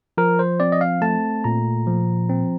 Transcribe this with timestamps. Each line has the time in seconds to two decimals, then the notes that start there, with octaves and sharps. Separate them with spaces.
0.18 F3 A#4
0.39 C5
0.60 C4 D5
0.72 D#5
0.81 F5
1.02 A3 A5
1.44 A#2 A#5
1.87 F3
2.30 C4